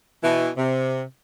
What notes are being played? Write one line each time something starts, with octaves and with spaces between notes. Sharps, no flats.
B2 E3
C3